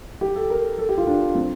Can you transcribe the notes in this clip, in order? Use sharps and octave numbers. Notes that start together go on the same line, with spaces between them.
G4
A4
A#4
A4
G4
F4
D4
C4